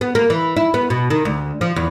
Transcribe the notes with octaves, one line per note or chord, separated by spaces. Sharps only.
B3
A#3
E3
E4
B3
B2
D#3
D2
F3
E2